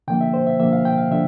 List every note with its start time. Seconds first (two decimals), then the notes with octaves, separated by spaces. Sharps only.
0.08 D3 F3 A#3 G5
0.21 E5
0.34 C5
0.47 E5
0.60 D3 F3 A#3 E5
0.73 F5
0.85 G5
0.98 F5
1.11 D3 F3 E5